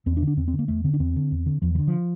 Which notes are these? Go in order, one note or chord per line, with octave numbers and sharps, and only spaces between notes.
E2 C4
D4
D3
D4
E2 C4
C4
D3
A#3
E2 A3
D3 C4
D4
E2 C4
D3
E2
D3
E2 F3
E3
D3
F3